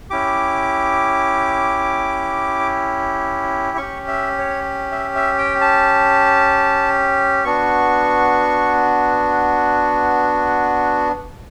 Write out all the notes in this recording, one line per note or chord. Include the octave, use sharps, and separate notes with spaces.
C#4 E4 G4 D6
C#4 G4 C#6
E5
C#5
E5
E5
G5
A5
B3 D4 F#4 C#6